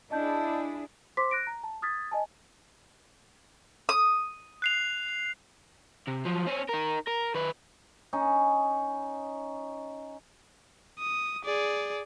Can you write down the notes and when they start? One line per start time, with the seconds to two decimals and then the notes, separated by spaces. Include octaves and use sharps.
0.11 D4 E4 G#4 D#5 A5 G6
1.17 C5 C6 D6 B6
1.31 F#6 A#6 D7
1.47 A#5
1.64 A5
1.82 D#6 F6 G#6 A6 B6
2.11 D#5 G#5 A5
3.89 D#6
4.62 F#6 C7 F7
6.08 C3
6.26 F3 F#3
6.47 C4 C#4
6.69 D#4 A#4
7.07 A#4
7.34 D#3 B4
8.13 C#4 D#4
10.99 D#6
11.45 G#4 D5